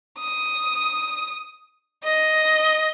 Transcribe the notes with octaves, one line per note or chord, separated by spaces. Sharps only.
D#6
D#5